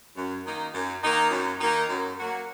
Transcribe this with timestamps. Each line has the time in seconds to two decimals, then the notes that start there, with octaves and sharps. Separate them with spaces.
0.16 F#2
0.44 D#3 A#3 D#4
0.74 F#2
1.02 D#3 A#3 D#4
1.31 F#2
1.60 D#3 A#3 D#4
1.90 F#2
2.18 F#3 A#3 F#4